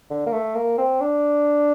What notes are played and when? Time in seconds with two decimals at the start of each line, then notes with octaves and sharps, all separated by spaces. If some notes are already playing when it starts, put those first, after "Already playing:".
0.10 D3
0.26 A#3
0.32 A3
0.55 A#3
0.78 C4
1.00 D4